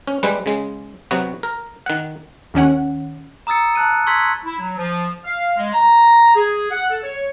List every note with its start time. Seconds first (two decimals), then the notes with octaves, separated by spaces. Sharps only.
0.08 C#4
0.23 G3 G#3 B4
0.46 C#3 G#3
1.11 C3 F#3 B3 F#4
1.43 A#4
1.86 D#3 F#5
2.54 D#2 D#3 C#4 F#5
3.47 A#5 D#6 E6 A6 C#7
3.75 A5 F#6 D#7
4.07 C6 C#6 E6 G#6 B6
4.44 E4
4.59 F#3
4.77 F3
5.25 F5
5.57 G#3
5.73 A#5
6.35 G#4
6.70 F#5
6.90 A4
7.03 C#5